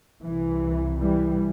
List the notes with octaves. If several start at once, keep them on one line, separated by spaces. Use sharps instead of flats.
C2 C3 E3
E3 G3